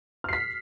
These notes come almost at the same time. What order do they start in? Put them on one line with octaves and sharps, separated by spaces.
F6 C7 B6